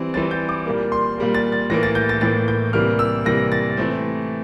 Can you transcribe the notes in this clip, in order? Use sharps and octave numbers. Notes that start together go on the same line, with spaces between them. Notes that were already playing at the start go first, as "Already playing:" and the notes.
Already playing: E3 G3 C4
E3 G3 C4 A6
G6
D6
A#2 G3 A#3
C6
A#2 G3 A#3
A6
A6
A2 E3 A#3 A#6
A6
G6
A6
A2 E3 A#3 A6
G6
C3 E3 G3 A#3 F6
E6
C3 E3 G3 A#3 A#6
A6
E3 A3 C4